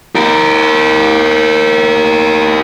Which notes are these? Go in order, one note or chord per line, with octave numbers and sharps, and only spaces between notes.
G4 A#4